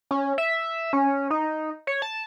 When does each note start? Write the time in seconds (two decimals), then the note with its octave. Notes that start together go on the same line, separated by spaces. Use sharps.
0.11 C#4
0.38 E5
0.93 C#4
1.30 D#4
1.87 C#5
2.02 A5